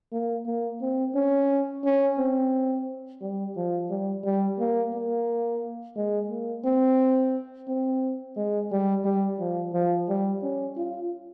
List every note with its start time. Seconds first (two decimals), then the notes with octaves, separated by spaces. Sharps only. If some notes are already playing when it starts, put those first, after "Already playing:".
0.12 A#3
0.47 A#3
0.81 C4
1.15 C#4
1.85 C#4
2.18 C4
3.21 G3
3.56 F3
3.90 G3
4.24 G3
4.59 A#3
4.93 A#3
5.96 G#3
6.30 A#3
6.65 C4
7.68 C4
8.36 G#3
8.71 G3
9.05 G3
9.39 F3
9.73 F3
10.08 G3
10.43 C#4
10.77 F4